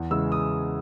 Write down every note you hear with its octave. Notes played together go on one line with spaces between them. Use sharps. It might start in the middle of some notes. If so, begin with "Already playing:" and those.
Already playing: E2
C#3 E3 G#3 E6
D#6